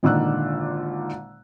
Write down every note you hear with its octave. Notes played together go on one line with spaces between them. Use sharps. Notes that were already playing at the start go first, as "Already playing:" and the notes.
G#1 A#2 D3 D#3 E6 F#6